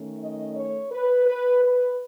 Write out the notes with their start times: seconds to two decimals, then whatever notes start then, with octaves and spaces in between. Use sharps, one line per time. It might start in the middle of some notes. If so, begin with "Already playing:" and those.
Already playing: D#3 A3 C#4
0.19 D#5
0.55 C#5
0.91 B4
1.26 B4
1.63 B4